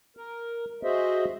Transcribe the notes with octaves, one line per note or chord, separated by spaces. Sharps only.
A#4
F#4 G#4 C5 D#5 E5